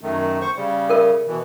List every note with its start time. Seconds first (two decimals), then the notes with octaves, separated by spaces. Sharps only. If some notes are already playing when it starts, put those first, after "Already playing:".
0.01 F#2 D#3 A3
0.41 C5 C#6
0.57 C#3 G3
0.89 A4 A#4 E5
1.27 B2 E3